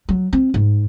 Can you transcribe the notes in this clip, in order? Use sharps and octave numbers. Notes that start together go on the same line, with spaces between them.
F#3
C4
G#2